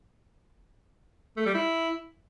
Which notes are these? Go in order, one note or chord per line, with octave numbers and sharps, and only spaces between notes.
A3
G3
E4